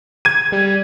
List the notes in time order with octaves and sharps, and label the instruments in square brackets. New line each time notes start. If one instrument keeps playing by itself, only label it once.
[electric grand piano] G#6 D#7
[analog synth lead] G3